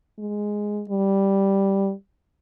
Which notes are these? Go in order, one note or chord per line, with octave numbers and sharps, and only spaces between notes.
G#3
G3